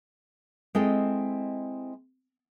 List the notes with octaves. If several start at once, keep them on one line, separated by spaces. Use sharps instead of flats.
G#3 C4 E4 A4 D#5 G5